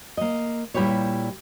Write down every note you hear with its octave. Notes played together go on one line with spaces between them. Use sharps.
A#3 D#5
A#2 G3 E4 G4 B4 C#5